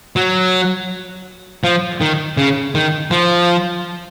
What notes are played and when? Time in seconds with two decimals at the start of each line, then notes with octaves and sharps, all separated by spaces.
0.16 F#3
1.64 F3
2.01 D#3
2.37 C#3
2.75 D#3
3.11 F3